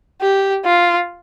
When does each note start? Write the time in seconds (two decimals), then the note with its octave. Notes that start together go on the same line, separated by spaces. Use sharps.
0.21 G4
0.65 F4